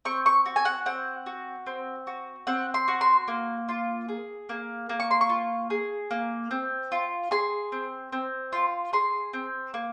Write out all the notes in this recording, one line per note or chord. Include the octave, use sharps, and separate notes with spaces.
C4 C#6
C#6
F#4
G#5
F#5
C4 F#5
F#4
C4
F#4
C4 F#5
C6
F#4
C6
A#3
F4
G#4
A#3
A#3
C#6
C6
C#6
F4
G#4
A#3
C4
F4
G#4 C6
C4
C4
F4
G#4 C6
C4
A#3